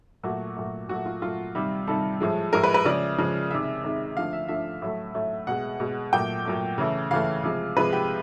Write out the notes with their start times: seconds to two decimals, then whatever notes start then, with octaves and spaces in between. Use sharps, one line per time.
0.23 A#2 F#3 A3 F#4
0.57 A#2 F#3 A3
0.89 A#2 F#3 A3 F#4
1.06 F4
1.22 A#2 F#3 A3 F4
1.55 C3 D#3 G3
1.87 C3 D#3 G3 A4
2.20 A2 F3 G#3
2.53 A2 F3 G#3 A#4
2.64 B4
2.74 B4
2.85 C#3 F3 G#3 D5
3.18 C#3 F3 G#3
3.51 C3 D#3 G#3 E5
3.83 C3 D#3 G#3
4.16 D3 F3 A3 F5
4.33 E5
4.48 D3 F3 A3 E5
4.82 A2 F#3 A3
5.14 A2 F#3 A3
5.47 B2 G#3 F#5
5.80 B2 G#3
6.13 A#2 F#3 A3 G5
6.45 A#2 F#3 A3
6.78 C#3 E3 A3
7.11 C#3 E3 A3 F5
7.43 C3 F3 G#3
7.76 C3 F3 G#3 B4
7.93 G4